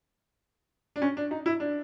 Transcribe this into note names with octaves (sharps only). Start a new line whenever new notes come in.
D4
C#4
D4
D#4
E4
D4